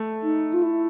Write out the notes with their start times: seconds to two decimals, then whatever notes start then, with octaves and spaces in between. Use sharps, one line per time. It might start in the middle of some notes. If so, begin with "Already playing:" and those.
Already playing: A3
0.23 D#4
0.54 F4
0.63 E4